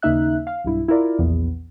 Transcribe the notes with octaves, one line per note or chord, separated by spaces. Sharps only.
D#2 C#3 A#3 D#4 E5 F#6
F5
B1 G2 E4
E4 F4 A#4 D5
A#1 E2 B3